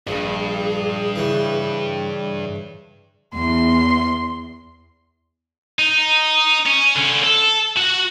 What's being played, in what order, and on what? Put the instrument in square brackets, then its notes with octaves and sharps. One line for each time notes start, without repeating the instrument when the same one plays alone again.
[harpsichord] A#1 [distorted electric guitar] G2 [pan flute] G#4
[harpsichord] C#3 E3
[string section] E2 [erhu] C6
[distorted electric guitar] D#4
C#4
D3 C#4
A4
F#4 F#5